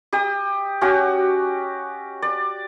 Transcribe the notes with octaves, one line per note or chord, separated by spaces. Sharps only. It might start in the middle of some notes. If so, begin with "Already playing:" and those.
G4 D#5 D#6
C#4 F#4 G4
D5